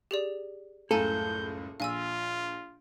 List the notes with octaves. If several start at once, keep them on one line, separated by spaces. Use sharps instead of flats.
G4 G#4 D5
F#1 C#2 A2 A4 F5 G#5 A#5 G6
A#1 F4 F5 G#5 E6